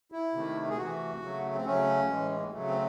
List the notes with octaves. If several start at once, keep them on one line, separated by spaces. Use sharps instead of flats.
E4
C3 D#3 A3
G#4
C3 E3 A3 F#4
C#3 F#3 A3
C4
C#3 F#3 A3 C#4
A2 E3 G#3
C#3 F#3 A3
C4